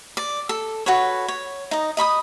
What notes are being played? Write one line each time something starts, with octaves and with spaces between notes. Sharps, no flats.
D5
A4
F#4 A4 B4 C#5
C#5
D#4 D#5
D#5 B5 C#6 D#6